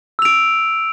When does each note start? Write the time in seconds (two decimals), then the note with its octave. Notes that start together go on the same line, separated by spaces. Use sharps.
0.19 E6
0.22 F7
0.25 D7